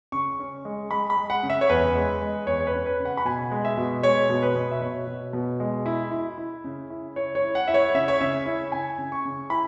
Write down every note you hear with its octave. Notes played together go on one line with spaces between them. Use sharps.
C#3 C#6
C#4
G#3
G#3 B5
B5
G#3
F#5
C#3
E5
C#5
E2 B4
G#3
G#3
E2 C#5
C#5
B4
C#4
B4
C#3
F#5
B5
B2 G#5
G#3
E5
B2
G#3 C#5
B2
B4
B2
E5
B2 C#5
B2
B2
G#3
E4
E4
E4
C#3
E4
E4 C#5
C#5
E4
F#5
E4 E5
C#5
C#3 E5
C#5
C#3 E5
E4
C#3 G#5
C#3
C#6
C#3
E4 B5